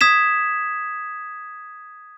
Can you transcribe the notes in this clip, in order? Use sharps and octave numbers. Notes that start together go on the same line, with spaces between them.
D#6 G#6 B6 E7